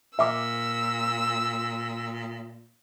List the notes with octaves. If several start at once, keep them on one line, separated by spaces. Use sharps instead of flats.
A#2 E5 D6 E6